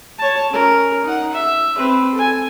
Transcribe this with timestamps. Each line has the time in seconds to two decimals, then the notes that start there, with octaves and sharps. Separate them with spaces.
0.19 C#5 A5
0.51 C#4 A#4
1.04 D#4 F#5
1.33 E5
1.78 C4 B4
2.14 A4 G#5